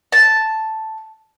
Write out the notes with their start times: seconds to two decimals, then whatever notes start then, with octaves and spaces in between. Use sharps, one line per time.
0.12 A5